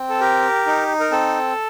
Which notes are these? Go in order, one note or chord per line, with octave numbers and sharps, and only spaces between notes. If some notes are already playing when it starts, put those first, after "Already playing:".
Already playing: C4
A4
G4 A#4
D#4
A#4
C4 A4